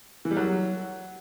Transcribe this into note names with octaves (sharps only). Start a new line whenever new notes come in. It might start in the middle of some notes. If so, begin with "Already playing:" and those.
E3
G3
F#3